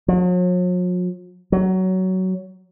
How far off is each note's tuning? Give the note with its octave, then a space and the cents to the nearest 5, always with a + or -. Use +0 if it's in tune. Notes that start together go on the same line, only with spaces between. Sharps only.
F#3 -45
F#3 +15